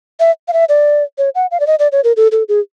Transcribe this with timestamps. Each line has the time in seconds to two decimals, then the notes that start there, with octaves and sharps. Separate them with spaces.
0.20 E5
0.48 F5
0.53 E5
0.69 D5
1.18 C#5
1.35 F#5
1.51 F5
1.60 D5
1.67 D#5
1.79 D5
1.92 C#5
2.04 A#4
2.17 A4
2.32 A4
2.49 G#4